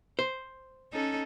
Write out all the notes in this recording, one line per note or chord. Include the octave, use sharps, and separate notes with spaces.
C5
C#4 D#4 A4